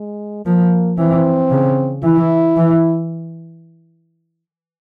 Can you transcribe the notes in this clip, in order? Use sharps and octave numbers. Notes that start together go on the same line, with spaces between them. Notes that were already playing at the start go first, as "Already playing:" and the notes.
Already playing: G#3
F3 A#3
E3 C4
C#3
E3 E4
E3